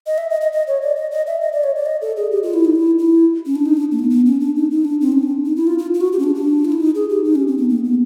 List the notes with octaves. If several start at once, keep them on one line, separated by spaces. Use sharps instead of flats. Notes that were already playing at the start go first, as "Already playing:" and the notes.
D#5
E5
D#5
D#5
D#5
C#5
D5
D#5
D#5
E5
D#5
D5
C#5
D5
D#5
A4
G#4
G4
F4
E4
D#4
E4
E4
C#4
D4
D#4
D4
A#3
B3
B3
C#4
D4
D#4
D#4
D4
C4
C#4
D4
D#4
E4
F4
F4
F4
F#4
G4
C#4
D4
D4
F4
E4
D#4
G#4
G4
D#4
C#4
C4
B3
A#3
B3